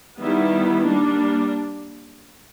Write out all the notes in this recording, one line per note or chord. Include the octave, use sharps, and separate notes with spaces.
D#3 G3 B3 E4
G3 A#3 D4